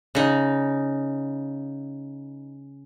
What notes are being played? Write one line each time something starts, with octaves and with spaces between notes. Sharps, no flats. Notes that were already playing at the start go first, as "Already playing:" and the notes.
C#3 D#4